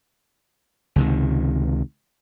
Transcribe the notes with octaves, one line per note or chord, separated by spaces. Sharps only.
C#2 C3 D#3